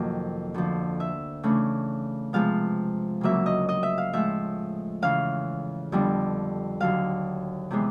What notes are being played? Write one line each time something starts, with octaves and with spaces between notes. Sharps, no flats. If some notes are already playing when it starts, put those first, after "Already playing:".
Already playing: F2 C3 D#3 F#3 A#3
D2 D3 F3
E5
C#3 E3 A3 D4
C3 F3 G#3 B3 F5
D2 C#3 F#3 A#3 C#4 E5
D#5
D#5
E5
F5
A2 F3 G#3 E5
E2 C#3 E3 F5
F2 D3 G3 B3 D4
D#2 D3 F#3 F5
C3 E3 G#3 B3